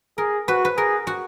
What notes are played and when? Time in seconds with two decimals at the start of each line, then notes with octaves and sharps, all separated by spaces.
0.18 G#4 A#4
0.48 F#4 B4
0.65 B4
0.77 G#4 A#4
1.07 F#4